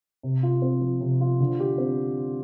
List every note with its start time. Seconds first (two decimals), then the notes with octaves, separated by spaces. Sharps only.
0.23 C3
0.43 F4
0.62 C4
0.81 F3
1.01 C3
1.21 F4
1.40 D3
1.60 G4
1.78 C4